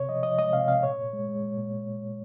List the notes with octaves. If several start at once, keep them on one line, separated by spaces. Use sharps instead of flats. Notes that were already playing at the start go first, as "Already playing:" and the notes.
Already playing: C3 C#5
F3 D#5
F3 D#5
G#3 D#5
C3 F5
C3 F5
A#2 C#5
A#2
G#3
G#3
A#2
A#2